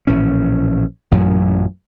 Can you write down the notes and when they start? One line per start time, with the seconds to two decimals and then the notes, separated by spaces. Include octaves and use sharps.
0.07 A#1 A2 E3 C#4
1.11 A1 F#2 A#2 F#3